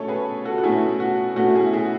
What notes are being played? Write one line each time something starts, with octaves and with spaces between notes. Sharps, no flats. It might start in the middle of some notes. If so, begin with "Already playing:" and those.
Already playing: B2 A3 C#4 A4 C#5
G#4 B4
F#4 A4
F#4
B2 A3 C#4 E4 G#4
F#4
B2 A3 C#4 F#4
E4 G#4
E4 G#4